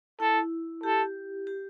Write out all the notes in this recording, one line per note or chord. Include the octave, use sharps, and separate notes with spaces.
E4 A4
G4 A4
G4